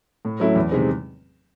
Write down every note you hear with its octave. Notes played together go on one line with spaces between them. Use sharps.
A2
F#3 A3 C#4 E4
E2
C3 D#3 G#3 C4